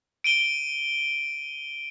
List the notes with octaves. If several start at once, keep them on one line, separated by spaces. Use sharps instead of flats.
D7 D#7 G7